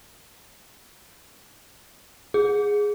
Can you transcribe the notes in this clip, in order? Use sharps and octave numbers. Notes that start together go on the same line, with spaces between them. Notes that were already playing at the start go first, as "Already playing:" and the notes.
G#4